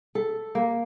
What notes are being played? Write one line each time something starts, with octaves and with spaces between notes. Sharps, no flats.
A4
A#3